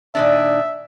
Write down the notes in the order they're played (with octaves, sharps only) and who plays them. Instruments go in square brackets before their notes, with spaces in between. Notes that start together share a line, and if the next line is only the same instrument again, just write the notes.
[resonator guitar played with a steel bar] A#2 D#3 D4 [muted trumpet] E5